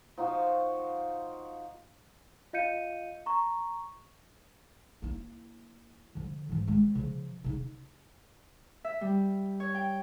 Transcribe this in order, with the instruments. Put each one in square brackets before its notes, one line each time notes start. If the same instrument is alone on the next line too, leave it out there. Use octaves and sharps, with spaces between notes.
[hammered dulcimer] F3 D#4 F4 F#4
[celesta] F4 D#5 F5 G6 C#7 D#7
A#5 C#6
[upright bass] A#3 E4
D3 F3
G#2 E3
G#3 C4
C#3 F3
C#3 D#4
[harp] E5
G3
C#5
G5